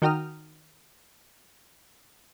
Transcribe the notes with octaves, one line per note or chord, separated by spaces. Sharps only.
D#3 F#4 G5 A#5 D#6 F6